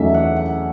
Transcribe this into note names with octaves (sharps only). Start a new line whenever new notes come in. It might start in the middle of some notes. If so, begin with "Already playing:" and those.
Already playing: E2 D#3 F#3 A3 C#4 E5
F#5
F#5